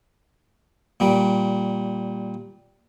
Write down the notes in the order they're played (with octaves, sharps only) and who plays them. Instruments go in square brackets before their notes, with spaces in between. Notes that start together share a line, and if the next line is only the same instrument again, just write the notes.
[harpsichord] A#2 G3